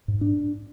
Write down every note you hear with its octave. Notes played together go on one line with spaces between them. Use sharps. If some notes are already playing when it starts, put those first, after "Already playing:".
G#2
D4